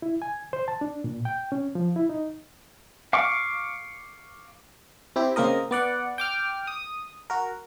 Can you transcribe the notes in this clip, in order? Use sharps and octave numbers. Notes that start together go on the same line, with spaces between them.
E4
G#5
C5
A5
D4
A#2
G5
C#4
F3
E4
D#4
F5 C#6 D6
C4 E4 G4
C#3 A#3 C4 A#4 D#5
B3 D5 F#5
G5 D6 F6
D#6
F#4 A#4